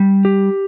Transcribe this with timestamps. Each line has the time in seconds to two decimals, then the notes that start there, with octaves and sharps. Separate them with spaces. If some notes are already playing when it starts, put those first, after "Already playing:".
Already playing: G3
0.25 G4